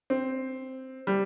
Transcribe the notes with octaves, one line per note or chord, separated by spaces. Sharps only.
C4
G3